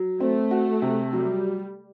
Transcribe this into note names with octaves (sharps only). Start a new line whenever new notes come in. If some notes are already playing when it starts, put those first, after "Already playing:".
Already playing: F#3
A3 C4
F#4
C3
F#3 G3